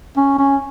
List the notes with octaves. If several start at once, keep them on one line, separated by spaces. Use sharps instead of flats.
C#4
C#4